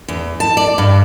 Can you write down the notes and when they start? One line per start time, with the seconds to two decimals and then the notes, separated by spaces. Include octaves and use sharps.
0.08 E2
0.40 A5
0.57 D5
0.78 G2